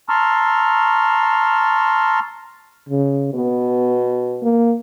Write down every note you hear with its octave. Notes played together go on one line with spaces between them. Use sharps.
A5 A#5 C6 C#6 E6 F6
C#3
B2 B3
A#3